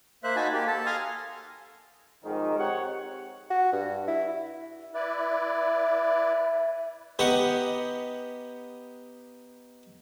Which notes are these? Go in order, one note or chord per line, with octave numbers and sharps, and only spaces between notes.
A#3 C5 E5 F#6
D#4 F#4 G#5 A5 B5
A#3 G4
A4 A5
F5 G#5 A#5 C6 D#6 F6
F2 G#2 D#3
C4 G4 C#5 F#5
F#4
G2
E4
E4 B4 D5 E5
B3 D#4 G4 B4 F#5 C#6